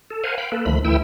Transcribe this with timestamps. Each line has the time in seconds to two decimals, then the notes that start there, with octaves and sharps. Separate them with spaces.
0.10 A4
0.24 A#4 C5 F5 F#5 G#5
0.38 F5 G5 B5
0.52 A#3 A4 B4
0.66 D2 D#3 F3 A3 B5
0.85 D2 E3 A3 E4 G5 E6